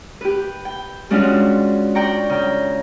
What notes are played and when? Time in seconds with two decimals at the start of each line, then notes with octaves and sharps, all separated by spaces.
0.21 G4 B4
0.65 G5
1.10 G3 G#3 C#4 D4 F4 F#4
1.95 D5 G5 A#5 C#6
2.30 C#3 G5